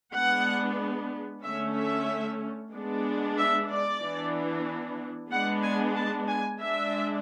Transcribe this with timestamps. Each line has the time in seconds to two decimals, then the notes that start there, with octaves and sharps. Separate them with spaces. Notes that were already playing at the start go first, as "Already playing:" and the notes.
0.14 G#3 B3 D4 F#5
1.43 D3 A3 C#4 E5
1.76 E5
2.73 G#3 B3 D4
3.38 E5
3.70 D5
4.02 E3 B3 D4
5.31 G#3 B3 D4 F#5
5.63 G#5
5.95 A5
6.27 G#5
6.61 G#3 D4 E5